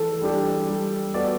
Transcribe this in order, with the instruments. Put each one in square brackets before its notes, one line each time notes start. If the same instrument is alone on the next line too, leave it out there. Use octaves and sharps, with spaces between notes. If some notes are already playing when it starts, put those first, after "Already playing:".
Already playing: [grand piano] E3 [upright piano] A4
[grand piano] G3 D4 G4
G3
B3 F#4 A4 D5